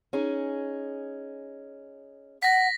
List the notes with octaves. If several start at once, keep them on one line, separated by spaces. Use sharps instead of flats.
C#4 D#4 G#4
F#5 A#6 B6